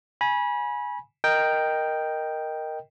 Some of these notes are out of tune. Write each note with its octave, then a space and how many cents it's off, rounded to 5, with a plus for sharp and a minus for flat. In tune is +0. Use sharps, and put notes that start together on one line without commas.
G#5 +0 B5 -30
A#4 +0 D#5 +0 G5 +0